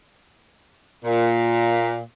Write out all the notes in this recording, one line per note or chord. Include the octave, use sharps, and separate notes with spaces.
A#2